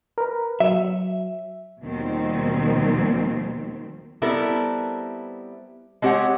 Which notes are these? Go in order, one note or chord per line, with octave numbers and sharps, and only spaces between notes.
A#4 B4
F#3 E5
D#2 B2 D#3 F3 G3 C4
G3 B3 C4 E4 A4 A#4
G#3 C4 G4 C#5 F#5